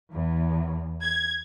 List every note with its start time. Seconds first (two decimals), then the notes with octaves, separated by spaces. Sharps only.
0.13 E2
1.02 G#6